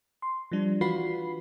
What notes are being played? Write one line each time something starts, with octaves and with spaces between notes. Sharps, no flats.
C6
F3 G3 D4
E3 F4 F#4 B4 B5 C7